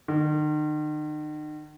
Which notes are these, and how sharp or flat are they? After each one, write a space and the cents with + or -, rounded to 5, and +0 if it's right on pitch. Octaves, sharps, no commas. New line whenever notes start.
D#3 -40